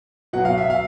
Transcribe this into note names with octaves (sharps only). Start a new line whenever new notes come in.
B2 F#3 F#5
F5
E5
F5